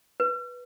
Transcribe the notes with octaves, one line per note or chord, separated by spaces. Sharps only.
B4